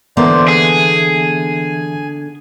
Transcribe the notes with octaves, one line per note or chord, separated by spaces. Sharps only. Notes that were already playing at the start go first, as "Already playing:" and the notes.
D3 E3 A#3 B3 C5 D5 E5
G#4 G#5